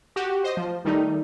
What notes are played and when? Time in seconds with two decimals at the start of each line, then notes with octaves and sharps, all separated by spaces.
0.16 F#4 G4
0.44 C5 D#5
0.57 F3
0.85 D#3 G3 A3 D#4